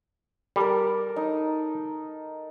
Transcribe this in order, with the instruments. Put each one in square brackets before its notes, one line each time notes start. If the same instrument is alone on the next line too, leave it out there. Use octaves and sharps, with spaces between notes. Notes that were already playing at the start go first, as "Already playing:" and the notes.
[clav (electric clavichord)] G3 [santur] A4 A#4
[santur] D#4